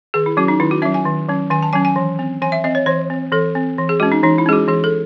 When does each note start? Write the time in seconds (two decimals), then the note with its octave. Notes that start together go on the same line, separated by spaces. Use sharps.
0.14 D#3 G#4
0.26 E4
0.37 F#3 C#4 F#4
0.48 D#4
0.60 D#3 E4
0.71 F#4
0.82 C#4 E5
0.86 F#3
0.94 G#5
1.05 D#3
1.28 F#3 C#4
1.50 D#3 G#5
1.62 A5
1.73 F#3 C#4 G#5
1.85 G#5
1.96 E3
2.19 C4
2.42 E3 G#5
2.52 E5
2.64 C4 D#5
2.75 C#5
2.86 E3 C5
3.10 C4
3.32 E3 A4
3.55 C4
3.78 E3
3.89 G#4
4.00 G#3 C#4 F#4
4.12 D#4
4.23 E3 D#4
4.38 E4
4.46 G#3 C#4 G#4
4.53 F#4
4.68 E3 G#4
4.84 A4